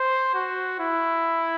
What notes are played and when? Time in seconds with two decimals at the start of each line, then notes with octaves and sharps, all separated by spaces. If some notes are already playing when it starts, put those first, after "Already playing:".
Already playing: C5
0.34 F#4
0.80 E4